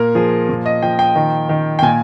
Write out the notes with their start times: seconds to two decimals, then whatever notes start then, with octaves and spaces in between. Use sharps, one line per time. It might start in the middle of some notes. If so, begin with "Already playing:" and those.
Already playing: A#2 A#4
0.15 F3 G#4
0.49 A#2
0.66 D#5
0.82 F3 G5
0.99 G5
1.16 D#3
1.49 D#3
1.79 G5
1.82 A#2 G#5